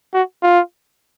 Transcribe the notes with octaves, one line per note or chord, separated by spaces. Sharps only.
F#4
F4